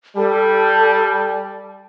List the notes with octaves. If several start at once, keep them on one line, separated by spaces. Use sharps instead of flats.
G3 A4 A5